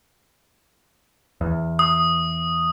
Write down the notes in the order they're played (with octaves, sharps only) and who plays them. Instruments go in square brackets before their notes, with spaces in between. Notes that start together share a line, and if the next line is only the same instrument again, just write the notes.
[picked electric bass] E2
[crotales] D#6